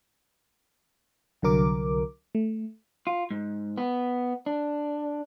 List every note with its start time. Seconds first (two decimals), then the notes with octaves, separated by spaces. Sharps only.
1.42 C2 D3 F#3 A#4 D6
2.35 A3
3.07 F4
3.31 G#2
3.78 B3
4.46 D4